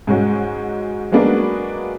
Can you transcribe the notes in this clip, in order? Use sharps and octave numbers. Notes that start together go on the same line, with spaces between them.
G#2 G#3 C#4 F#4
F#3 G#3 A#3 B3 D4 F#4